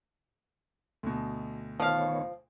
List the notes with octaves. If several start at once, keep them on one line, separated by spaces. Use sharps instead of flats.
D2 B2
D#3 F3 B3 C#5 F5